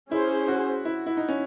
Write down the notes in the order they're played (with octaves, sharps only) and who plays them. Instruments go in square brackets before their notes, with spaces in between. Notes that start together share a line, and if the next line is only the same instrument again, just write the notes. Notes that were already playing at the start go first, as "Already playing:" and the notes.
[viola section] C#4 G#4 C5 [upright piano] E4
[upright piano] F#4
E4
E4
D#4
C#4